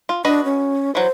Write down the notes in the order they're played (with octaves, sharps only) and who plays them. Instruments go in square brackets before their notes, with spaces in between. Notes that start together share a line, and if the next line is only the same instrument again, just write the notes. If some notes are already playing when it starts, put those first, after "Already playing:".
[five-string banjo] F4
[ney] D4 [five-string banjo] F#4 B4 D#5
[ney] C#4
[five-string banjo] E3 F#3 [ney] C5